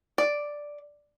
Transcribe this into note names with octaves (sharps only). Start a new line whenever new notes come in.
D5